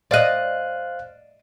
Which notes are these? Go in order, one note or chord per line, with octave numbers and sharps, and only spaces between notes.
C5 D5 D#5 F5 F#6